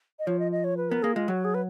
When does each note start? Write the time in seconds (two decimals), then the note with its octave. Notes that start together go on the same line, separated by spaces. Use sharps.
0.19 D#5
0.27 F3 C#5
0.39 D#5
0.52 D#5
0.64 C#5
0.77 B4
0.89 B3 A#4
1.03 A#3 G#4
1.15 G#3 F4
1.28 F#3 F#4
1.45 G#4
1.54 B4